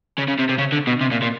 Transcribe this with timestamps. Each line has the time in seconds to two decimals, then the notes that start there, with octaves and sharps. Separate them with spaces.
0.18 C#3
0.28 C#3
0.39 C3
0.49 C3
0.58 C#3
0.72 D3
0.87 B2
1.01 C3
1.12 A#2
1.22 A#2